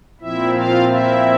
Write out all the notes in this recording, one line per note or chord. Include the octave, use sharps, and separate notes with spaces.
A#2 F3 C4 E4 E5
F4 F5
E4 E5